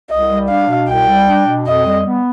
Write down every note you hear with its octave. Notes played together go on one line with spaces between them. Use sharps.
C2 D#5
G3
D4 F5
B2
C2 G5
G3
D4
B2
F2 D#5
G3
B3